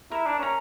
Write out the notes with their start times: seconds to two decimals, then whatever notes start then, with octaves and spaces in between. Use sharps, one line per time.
0.11 E4 A#4
0.26 D4
0.39 C#4 A#5